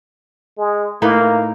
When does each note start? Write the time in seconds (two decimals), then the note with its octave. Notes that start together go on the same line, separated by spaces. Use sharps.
0.58 G#3
1.02 A2 A#3 D#4 B4